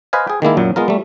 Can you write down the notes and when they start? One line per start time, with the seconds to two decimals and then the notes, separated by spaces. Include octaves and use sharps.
0.13 B4 C5 D#5 F5 G#5
0.27 G#4 G5
0.42 D#3 G#3 A#3 E4
0.57 F#2 A#2 F#3
0.76 G#3 B3 F4 A#4
0.88 G3 A3